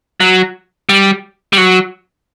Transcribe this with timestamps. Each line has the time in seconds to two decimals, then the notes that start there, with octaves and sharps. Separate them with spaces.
0.20 F#3
0.89 G3
1.53 G3
1.58 F#3